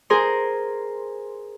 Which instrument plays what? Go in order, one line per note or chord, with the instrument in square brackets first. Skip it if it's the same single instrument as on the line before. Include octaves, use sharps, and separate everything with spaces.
[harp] G#4 A#4 C5 C6